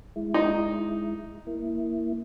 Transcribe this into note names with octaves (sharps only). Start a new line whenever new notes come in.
G#3 E4
D#4
A#3 E4